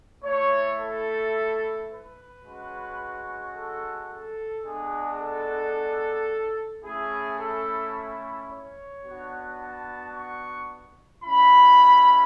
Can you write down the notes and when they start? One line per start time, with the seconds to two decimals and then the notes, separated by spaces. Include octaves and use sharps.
0.24 A3 E4 C#5
0.79 A4
1.89 B4
2.44 G#3 C#4 F#4
3.54 A4
4.09 A4
4.64 G#3 B3 D4 F#4 G#4
5.19 A4
6.84 A3 C#4 E4 G#4
7.39 A4
8.49 C#5
9.04 B3 D4 F#4
9.59 A5
10.14 C#6
11.24 G#3 C#4 E4 B5